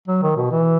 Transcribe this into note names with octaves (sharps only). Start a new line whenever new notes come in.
F#3
D#3
B2
E3